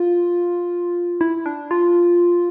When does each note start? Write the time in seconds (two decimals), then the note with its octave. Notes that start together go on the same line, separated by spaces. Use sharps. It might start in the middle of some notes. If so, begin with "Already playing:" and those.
Already playing: F4
1.21 E4
1.46 D4
1.71 F4